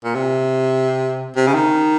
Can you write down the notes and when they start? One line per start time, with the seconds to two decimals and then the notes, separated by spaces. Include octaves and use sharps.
0.04 A#2
0.15 C3
1.36 C3
1.47 C#3
1.54 D#3